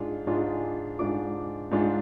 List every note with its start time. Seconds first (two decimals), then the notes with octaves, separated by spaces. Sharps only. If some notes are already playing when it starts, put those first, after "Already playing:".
Already playing: G#2 G#3 D4 F4
0.27 G#2 G#3 D4 F4
0.99 G#2 G#3 D4 F4 D6
1.71 G#2 G#3 D4 F4